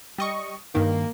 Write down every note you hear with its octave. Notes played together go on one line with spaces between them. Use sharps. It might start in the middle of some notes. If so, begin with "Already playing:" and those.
G3 D#5 C#6
G2 D#3 A#3